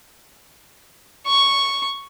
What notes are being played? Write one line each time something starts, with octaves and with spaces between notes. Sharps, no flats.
C#6